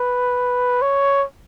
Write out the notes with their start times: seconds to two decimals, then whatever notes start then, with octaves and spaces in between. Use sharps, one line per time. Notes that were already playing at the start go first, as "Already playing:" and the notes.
Already playing: B4
0.82 C#5